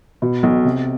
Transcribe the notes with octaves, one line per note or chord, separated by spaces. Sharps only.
B2
B1
C3